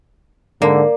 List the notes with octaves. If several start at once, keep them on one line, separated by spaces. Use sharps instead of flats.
G#2 D3 A#3 D5